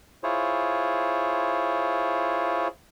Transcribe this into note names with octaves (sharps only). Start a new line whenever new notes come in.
E4 F4 G#4 C5 C#5